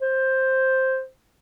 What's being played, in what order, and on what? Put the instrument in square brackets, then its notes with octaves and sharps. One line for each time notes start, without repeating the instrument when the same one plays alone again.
[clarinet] C5